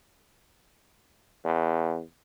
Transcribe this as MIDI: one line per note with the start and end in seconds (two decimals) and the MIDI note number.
1.45 2.01 40